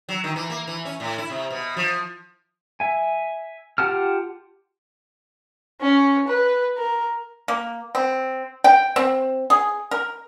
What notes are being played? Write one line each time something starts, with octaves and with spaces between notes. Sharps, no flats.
F#3
D#3
E3
A#3
E3
C#4
A2
E4
C3
B2
F3
E5 G#5
F4 G4 F#5 A5 F6
C#4
B4
A#4
A#3
C4
G5
C4
G#4
A#4